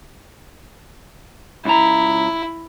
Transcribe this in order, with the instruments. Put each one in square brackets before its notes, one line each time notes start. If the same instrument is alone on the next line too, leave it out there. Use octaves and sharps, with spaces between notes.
[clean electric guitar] C#2 A#5 [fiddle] E4